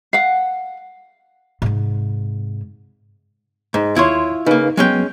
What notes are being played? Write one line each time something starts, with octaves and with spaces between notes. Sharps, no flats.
F5 F#5
G#2 C3
G#2
D#2 E4 F4 C#5 C6
C#3 A#3 D#4 B4
F#3 G#3 B3 C#4 G5